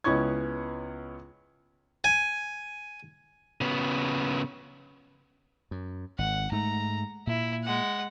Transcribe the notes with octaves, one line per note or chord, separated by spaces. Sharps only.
C#2 B3 C#4 E4 C#6 G#6
G#5
C#3 B3
F#2
G#1 F#5
G#2 A3 A#5
A#2 E4
G#3 F#5